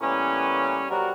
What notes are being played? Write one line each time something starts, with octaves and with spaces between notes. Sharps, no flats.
A2 E3 G3 A#3 B3 C#4
C3 F#3 G3 B3 F#4 A#4